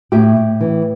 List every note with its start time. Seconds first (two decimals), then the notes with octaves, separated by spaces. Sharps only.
0.12 A2 G4
0.37 A2
0.61 E3